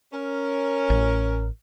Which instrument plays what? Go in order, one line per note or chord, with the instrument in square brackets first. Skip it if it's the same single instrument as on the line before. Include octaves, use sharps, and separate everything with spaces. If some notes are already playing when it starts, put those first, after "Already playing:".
[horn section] C#4 A#4
[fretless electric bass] A1